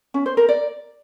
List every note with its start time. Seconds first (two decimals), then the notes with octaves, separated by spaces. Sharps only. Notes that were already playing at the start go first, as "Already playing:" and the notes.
0.14 C#4
0.26 C5
0.37 A#4
0.49 D5